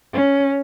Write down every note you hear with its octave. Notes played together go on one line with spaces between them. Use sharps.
C#4